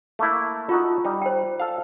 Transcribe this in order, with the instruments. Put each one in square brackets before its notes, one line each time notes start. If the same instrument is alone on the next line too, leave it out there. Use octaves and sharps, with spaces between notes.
[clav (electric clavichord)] A3 A#3 E4
[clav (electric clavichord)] D#4 F#4 A4 [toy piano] F4
[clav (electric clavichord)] G3 D#4
[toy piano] C5 G5
[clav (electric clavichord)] A4 F5